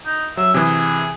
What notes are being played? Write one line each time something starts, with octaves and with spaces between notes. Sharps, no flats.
D#4
F#3 E5
C3 E3 G#4